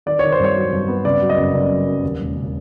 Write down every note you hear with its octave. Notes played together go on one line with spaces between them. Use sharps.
D#3 D5
D#3 C#5
C5
G2 C#5
F#3
G2
B3
C#3 D5
F#3
D#5
F#1
C#3 D5
F#3
F#2
D#2
E1
C#3